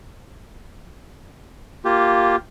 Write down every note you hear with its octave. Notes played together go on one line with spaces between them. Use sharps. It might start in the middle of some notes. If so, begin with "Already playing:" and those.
A#3 F4 G4